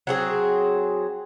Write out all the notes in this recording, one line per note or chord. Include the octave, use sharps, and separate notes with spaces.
F#3 C4 G#4